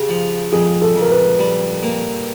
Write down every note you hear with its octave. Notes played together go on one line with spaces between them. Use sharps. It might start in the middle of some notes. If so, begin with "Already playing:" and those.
Already playing: C#3 G4
F3
F2 G#4
A4
F2
A#4
B4
G3
A#3